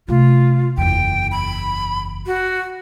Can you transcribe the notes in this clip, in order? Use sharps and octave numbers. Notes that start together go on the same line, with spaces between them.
C3 A3 F4
F#1 E2 G5
B5
F#4